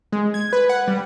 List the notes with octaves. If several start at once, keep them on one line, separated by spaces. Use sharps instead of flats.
G#3
G#6
B4
F#5
G3